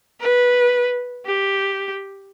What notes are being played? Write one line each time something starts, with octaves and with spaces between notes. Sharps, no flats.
B4
G4